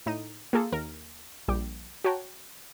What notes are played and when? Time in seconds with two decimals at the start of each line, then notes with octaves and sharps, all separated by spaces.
0.06 A2 D#4 D#7
0.53 A#3 F4 G#4 A4
0.72 D#2 A#4
1.48 A#1 G3 G5 D6
2.04 F#4 C#5 G5 A5 A#5